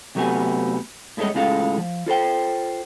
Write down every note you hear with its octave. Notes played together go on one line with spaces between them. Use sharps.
C3 F#3 A3 B3 G4 G#5
G2 G#3 A3 A4 C#5 D#5
A2 C#3 G#3 F4 A4 F5
F3
F4 A4 C5 G5